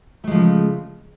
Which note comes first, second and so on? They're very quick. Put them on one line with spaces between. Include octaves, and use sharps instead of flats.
A3 G#3 F3 C#3